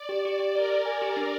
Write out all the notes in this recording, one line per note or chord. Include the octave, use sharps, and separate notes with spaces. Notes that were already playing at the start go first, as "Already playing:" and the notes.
Already playing: D5
G4
G4
G4
A#4 D5
D5
G#5
G4
D4